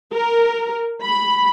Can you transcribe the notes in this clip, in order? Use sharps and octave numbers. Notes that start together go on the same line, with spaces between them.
A#4
B5